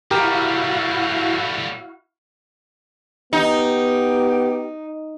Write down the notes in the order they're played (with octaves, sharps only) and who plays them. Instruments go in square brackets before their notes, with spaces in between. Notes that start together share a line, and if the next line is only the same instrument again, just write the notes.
[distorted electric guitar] A2 G3 [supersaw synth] E4 F#4 F5 [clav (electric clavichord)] G4 A#4
[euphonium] B3 [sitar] D#4 [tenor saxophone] G4